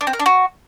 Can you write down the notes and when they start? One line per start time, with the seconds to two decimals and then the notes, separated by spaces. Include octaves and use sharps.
0.01 D4
0.07 C4
0.13 A#4
0.20 D4
0.26 F#4